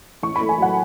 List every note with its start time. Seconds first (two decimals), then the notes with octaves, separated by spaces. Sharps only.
0.23 A1 C#6
0.36 B5
0.41 A3
0.49 G#5
0.58 F#3 F#5